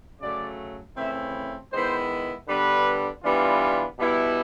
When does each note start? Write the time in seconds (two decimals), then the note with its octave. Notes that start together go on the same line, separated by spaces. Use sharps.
0.21 C#3 F#3 A3 D5
0.96 C#3 E3 A3 C4 E4 E5
1.72 D#3 G#3 B3 E4 C5
2.48 D3 G3 B3 D4 B4
3.23 E3 G3 B3 D4 F4
3.99 B2 G3 B3 E4